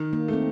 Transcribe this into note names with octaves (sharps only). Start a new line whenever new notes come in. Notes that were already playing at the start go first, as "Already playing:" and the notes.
Already playing: D#3
A#3
A3 C4